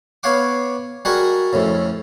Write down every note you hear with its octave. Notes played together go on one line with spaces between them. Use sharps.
B3 C#5 F5 F#5 D6
G3 F#4 G#4 A#4 D#5 F#5
F2 A2 C#3